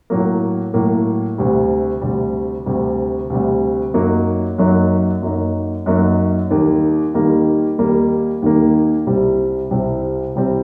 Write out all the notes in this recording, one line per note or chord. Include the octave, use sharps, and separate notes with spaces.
A2 F#3 A#3
A2 F#3 A#3
D2 C3 G3
D2 C3 G3
D2 C3 G3
D2 C3 G3
F#2 F#3 A#3 D#4
F#2 F#3 A#3 D#4
F#2 F#3 A#3 D#4
F#2 F#3 A#3 D#4
D#2 D#3 G3 A#3
D#2 D#3 G3 A#3
D#2 D#3 G3 A#3
D#2 D#3 G3 A#3
C2 C3 G3 C4
C2 C3 G3 C4
C2 C3 G3 C4